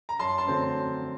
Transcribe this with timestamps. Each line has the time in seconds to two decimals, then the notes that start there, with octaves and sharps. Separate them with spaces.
0.09 A#5
0.19 F#2 A5 C6
0.38 A5 C6
0.48 D3 F#3 A3 C4